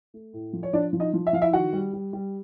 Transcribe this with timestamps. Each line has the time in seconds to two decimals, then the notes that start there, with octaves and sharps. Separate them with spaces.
0.14 A3
0.33 A2
0.53 F3
0.63 C#5
0.73 F3 D4 D5
0.93 F3
1.00 D#4 D#5
1.14 F3
1.27 E5
1.33 F3 F5
1.41 E4 E5
1.53 D#3 F#4 F#5
1.73 G3
1.93 G3
2.13 G3